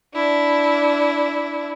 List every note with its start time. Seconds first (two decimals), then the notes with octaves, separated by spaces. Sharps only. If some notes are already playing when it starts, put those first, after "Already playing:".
0.14 D4 E4